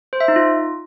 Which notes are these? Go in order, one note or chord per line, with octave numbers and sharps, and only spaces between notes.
C5
E5
D#4
F4